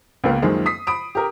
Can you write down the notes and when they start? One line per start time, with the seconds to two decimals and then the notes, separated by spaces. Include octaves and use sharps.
0.24 C#2 C#3 A#3 B3
0.42 F#2 D#3 F3 G#3 A#3
0.66 D#6 B6 C7
0.87 B5 D#6 D7
1.15 G4 A#4